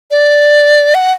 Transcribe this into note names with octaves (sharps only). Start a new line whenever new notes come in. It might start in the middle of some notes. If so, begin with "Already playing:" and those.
D5
F#5